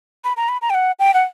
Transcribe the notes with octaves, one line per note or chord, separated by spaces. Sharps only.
B5
A#5
B5
A#5
G5
F#5
G5
F#5